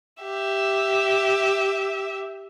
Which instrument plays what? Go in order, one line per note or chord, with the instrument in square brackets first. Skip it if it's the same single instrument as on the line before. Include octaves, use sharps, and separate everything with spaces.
[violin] G4 E5